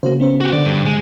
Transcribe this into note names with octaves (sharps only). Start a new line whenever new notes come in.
C#3 A#3 F#4 C5
B3 C#4 C5
F#4 G4
D3 D5
G2
G#3